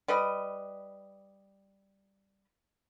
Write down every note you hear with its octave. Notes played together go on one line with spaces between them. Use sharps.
G3 B4 D#5